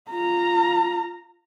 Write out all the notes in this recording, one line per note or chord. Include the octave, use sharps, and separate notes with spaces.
F4 A#5